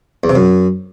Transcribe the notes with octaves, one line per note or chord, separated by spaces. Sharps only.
E2
C3
F#2